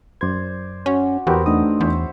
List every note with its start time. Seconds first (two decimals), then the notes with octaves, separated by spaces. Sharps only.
0.21 F#2 C5 D5 G#6
0.86 C#4 F#4
1.27 E2 B3 C4 F#4 G4 A#4
1.46 A3 D4 D#4 D#5 D#6
1.80 E2 C5 C#5 E5